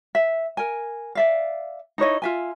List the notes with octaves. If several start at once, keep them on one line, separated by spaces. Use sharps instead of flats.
E5
A#4 G#5
D5 E5 F5
D#4 E4 C#5 D#5
F4 E5 G#5